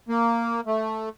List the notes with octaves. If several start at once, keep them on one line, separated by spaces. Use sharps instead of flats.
A#3
A3